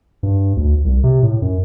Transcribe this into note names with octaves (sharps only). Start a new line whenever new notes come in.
G2
D2
C2
C3
A2
F#2